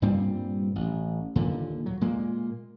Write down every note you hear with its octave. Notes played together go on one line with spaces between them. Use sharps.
G2 A#2 G3 C4
A1
D#2 A#2 D3
F#3
A#2 G#3 A#3